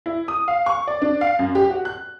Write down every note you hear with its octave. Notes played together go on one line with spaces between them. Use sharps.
E4
D#6
F5
C#6
D5
D4
F5
F#2
G4
F#4
F#6